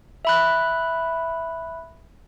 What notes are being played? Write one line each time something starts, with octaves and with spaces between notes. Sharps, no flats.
E5 B5 F#6